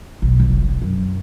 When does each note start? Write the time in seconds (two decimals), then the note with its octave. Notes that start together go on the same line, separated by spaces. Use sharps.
0.22 B1
0.40 F1
0.82 F#2